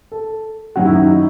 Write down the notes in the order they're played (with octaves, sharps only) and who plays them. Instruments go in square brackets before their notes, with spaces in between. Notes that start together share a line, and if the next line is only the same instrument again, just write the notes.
[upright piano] A4
[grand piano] F#2 D#3 F#3 C#4 [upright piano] F#4
[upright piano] E4
D#4
E4